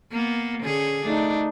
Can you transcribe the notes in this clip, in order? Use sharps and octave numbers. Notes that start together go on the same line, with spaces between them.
A#3 B3
D3 C#4 G#4
A3 D4 D#4